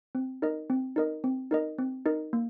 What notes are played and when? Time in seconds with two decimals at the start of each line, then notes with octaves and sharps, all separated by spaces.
0.15 C4
0.42 D#4 A#4 D#5
0.70 C4
0.96 D#4 A#4 D#5
1.24 C4
1.51 D#4 A#4 D#5
1.79 C4
2.06 D#4 A#4 D#5
2.33 A#3